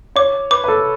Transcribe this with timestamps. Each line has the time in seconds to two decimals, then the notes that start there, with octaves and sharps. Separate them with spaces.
0.16 C#5 D6
0.51 B4 D6
0.64 B4
0.68 A4